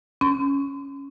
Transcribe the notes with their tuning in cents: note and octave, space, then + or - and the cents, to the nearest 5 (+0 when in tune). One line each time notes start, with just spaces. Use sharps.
C#4 +0 C6 -45